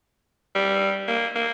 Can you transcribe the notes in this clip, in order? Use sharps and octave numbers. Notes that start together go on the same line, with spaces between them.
G3
A#3
A#3